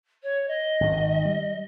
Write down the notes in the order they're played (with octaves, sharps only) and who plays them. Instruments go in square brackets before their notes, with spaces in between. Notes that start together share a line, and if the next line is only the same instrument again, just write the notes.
[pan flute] C#5
D#5
[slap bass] G#1 D#3
G3